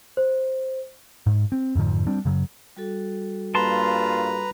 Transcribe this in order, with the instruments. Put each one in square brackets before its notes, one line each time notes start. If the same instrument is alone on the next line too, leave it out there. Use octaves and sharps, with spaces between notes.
[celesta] C5
[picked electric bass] G#2
C4
F2 G#2 D3 F3
G3 C4 D4
F#2 C#3 F#3
[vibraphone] G3 F#4 A4
[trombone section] G2 A#3 F4 [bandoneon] B4 A#5 [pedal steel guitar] A5 C6